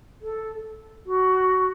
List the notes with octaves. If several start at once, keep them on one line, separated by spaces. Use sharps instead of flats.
A4
F#4